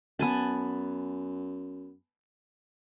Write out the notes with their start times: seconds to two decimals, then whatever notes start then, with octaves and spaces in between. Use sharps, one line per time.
0.19 F#2 B3 G#5 A5